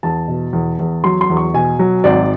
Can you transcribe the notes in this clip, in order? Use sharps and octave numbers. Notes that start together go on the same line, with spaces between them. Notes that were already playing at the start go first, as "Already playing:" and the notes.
E2 A5
B2
E2
E2
F#3 C6
C6
E2
C#6
B2 G#5
F#3
G#1 D5